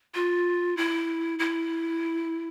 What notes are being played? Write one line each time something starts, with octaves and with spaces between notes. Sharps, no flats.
F4
E4
E4